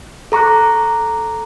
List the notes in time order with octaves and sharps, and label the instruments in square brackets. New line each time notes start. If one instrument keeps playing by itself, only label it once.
[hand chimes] A4 A#5 C#6 D6 F#6